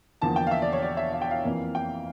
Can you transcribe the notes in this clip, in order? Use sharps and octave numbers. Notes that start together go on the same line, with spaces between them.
E2 D3 F3 A#3 A5
G5
F5
E5
D5
C#5
D5
E5
F5
G5
F5
F2 E3 A#3
G5